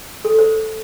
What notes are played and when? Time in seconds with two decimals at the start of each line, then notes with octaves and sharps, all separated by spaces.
0.25 A4
0.39 C5